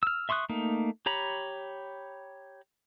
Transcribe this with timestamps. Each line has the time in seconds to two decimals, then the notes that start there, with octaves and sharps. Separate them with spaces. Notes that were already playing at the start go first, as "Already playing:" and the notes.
0.03 E6 F6
0.29 E5 C6 C#6 D#6 F#6
0.49 A3 A#3 D#4
1.06 G4 C#5 A#5 B5